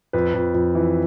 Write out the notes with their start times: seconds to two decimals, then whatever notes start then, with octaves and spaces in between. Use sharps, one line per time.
0.13 F2 B4
0.34 F2
0.54 F2
0.75 E3